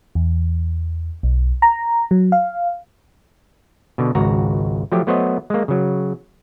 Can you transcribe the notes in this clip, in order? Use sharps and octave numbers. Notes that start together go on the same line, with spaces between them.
E2
B1
A#5
F#3
F5
B2 D3
G#1 C#2 F#4 A#5
F3 F#3 A3 G4
F#3 A3 B3 C5 C#5 D#5
G#3 A#3
C#3 F#3